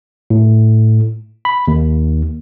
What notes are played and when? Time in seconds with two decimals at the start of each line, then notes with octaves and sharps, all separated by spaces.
0.30 A2
1.45 B5
1.68 D#2